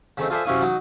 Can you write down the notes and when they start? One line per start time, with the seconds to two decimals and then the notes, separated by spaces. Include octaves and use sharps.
0.17 C#3 A3 C4 D#4
0.30 F4 G#4 A4 C5 D5 E5
0.45 F#2 C3 C#4 E4 F5 D#6
0.61 F#3 D#4